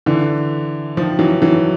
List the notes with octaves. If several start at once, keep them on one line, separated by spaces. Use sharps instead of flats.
D3 E3
D#3 F3
E3 F#3
E3 F#3